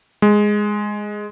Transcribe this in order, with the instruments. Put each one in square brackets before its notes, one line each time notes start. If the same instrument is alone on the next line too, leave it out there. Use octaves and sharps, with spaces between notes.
[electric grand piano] G#3